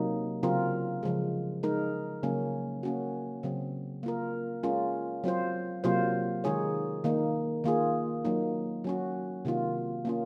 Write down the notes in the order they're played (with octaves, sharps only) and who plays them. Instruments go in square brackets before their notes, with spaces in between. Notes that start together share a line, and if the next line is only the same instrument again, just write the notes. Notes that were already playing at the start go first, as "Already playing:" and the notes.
Already playing: [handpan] C3 F#3 A#3 D#4
C#3 F#3 C4 F4 A#4
C#3 F3 G#3
G#3 D#4 A#4
C#3 F#3 A#3 C#4
A#3 C#4 F#4
C#3 F#3 C4
A#3 F4 A#4
G#3 C#4 F4 A#4
F#3 C4 F4 C5
C3 F#3 A#3 F4 C5
D#3 G#3 D#4 G#4 C#5
D#3 A#3 D#4
D#3 A#3 F4 G#4
F#3 A#3 D#4
F#3 C#4 F#4
C3 D#3 A#3 F4
A#3 C#4 F4